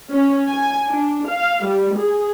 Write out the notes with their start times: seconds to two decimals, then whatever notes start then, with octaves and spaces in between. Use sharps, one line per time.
0.12 C#4
0.48 G#5
0.86 D4
1.27 F5
1.66 G3
1.97 G#4